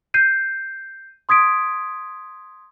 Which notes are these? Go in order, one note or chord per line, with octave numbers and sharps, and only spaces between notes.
G6 C7 D#7
C6 D#6 G#6 B6 D7